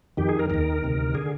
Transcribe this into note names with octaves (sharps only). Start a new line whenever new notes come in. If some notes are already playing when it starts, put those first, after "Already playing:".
F2 D#3 G4
G#4
A#4
D#2 D#3 A#4
D2 C3 D#3
D3 G#4